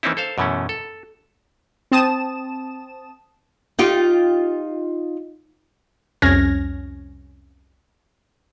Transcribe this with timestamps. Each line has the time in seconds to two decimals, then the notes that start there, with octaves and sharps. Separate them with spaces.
0.03 E3 A#3 C4 C#4 D#4 E4
0.17 A4 C5 F5
0.38 F#2 B2 E3 A3 C#4
0.69 A4
1.92 C4 A5 D#6 E7
3.79 D#4 F4 G4
6.22 C2 F2 C#4 F6 G#6 A#6